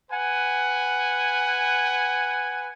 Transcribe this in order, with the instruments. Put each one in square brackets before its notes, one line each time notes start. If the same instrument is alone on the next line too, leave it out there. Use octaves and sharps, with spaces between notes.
[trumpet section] B4 F#5 G#5